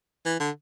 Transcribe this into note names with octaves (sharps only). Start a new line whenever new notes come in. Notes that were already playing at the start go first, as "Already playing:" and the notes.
E3
D3